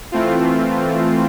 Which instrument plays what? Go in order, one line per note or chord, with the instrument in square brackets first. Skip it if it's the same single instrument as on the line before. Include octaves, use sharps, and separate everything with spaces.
[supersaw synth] E3 A3 C4 F4